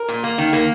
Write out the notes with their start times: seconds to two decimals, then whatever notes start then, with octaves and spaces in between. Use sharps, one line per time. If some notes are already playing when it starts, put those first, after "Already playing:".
Already playing: A#4
0.08 A#2
0.24 A#3
0.38 D#3
0.53 A#3